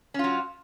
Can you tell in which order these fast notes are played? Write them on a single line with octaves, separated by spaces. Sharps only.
C#4 F4 F#3